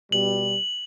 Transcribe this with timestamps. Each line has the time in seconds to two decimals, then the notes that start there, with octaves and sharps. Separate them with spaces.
0.12 B2 G3 F#7